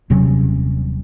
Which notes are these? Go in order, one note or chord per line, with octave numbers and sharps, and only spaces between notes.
D#1 C3 F#3 C#4